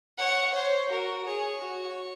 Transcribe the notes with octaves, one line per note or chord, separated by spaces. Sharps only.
C#5 F#5
C5 C#5
F#4 A#4
G#4 C#5
F#4